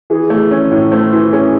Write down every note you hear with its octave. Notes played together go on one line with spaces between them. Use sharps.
E3 G#4
A3
C#4
C#5
A2
A3 C5
E3
C#4 G#4